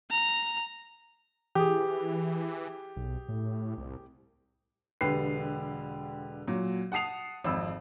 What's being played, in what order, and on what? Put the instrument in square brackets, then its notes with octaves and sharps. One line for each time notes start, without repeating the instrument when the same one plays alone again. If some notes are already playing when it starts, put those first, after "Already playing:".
[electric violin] A#5
[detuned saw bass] E3 [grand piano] G4 G#4
[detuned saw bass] B1
A2
C2
[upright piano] E1 D3 G4 B4 C7
A#2 F#3
F#5 A5 D#6 C7 F7
G#1 F2 B5 E6